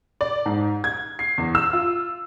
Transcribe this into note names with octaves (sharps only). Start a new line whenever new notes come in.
D5
G#2
G#6
C7
E2
E6
F4